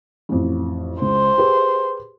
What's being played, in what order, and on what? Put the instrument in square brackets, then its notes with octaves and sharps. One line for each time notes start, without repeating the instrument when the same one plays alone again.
[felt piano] A1 F2
[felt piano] C#2 [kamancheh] C5
[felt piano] G4 G#4 B4